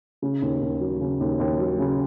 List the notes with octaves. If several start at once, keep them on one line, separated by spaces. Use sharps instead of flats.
C#3
D#2
D#2
F#3
C#3
D#2
D#2
F#3
C#3